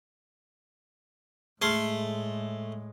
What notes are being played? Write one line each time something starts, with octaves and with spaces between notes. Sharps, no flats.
A2 G#3 A3 G#4 C6 F6